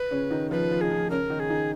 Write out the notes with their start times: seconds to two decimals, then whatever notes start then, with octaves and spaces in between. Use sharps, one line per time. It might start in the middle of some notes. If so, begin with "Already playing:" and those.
Already playing: B4
0.11 C#3 C#4
0.30 D#3 D#4
0.51 F3 F4 B4
0.71 F3 F4
0.81 D#4 G#4
0.91 F3 F4
1.10 C#3 C#4 A#4
1.30 D#3 D#4
1.40 G#4
1.50 D#3 D#4